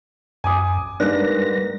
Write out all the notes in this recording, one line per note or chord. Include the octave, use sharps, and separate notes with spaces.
F#2 G#5 D6 D#6
G#2 G3 A#3 D4 B4 A#6